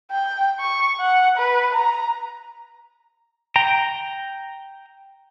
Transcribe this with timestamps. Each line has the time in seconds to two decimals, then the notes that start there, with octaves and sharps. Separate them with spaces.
0.11 G5
0.60 C#6
1.01 F#5
1.37 B4
1.74 A#5
3.56 G5 A#5